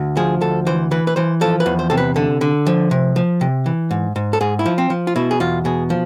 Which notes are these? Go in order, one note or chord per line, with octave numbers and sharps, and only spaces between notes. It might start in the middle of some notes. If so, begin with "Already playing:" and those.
Already playing: D2
F3 G#4
D2 A4
E3 C5
E3 B4
B4
E3 C5
F3 A4
B4
E2
C5
C3 A4
B4
D3 A4
D3
F3
C3
F3
C3
E3
G#2
G#2
A4
G#2 G#4
E4
F3
C4
F3
F4
B2 E4
G#4
E2 F4
B2 G#4
F3